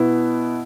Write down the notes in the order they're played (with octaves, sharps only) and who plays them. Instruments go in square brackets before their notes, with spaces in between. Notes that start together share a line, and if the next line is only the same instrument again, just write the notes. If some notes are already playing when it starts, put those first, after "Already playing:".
Already playing: [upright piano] B2 B3 E4